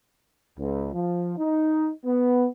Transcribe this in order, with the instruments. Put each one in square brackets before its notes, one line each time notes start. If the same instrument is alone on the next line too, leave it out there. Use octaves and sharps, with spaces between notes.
[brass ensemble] C#2
F3
D#4
B3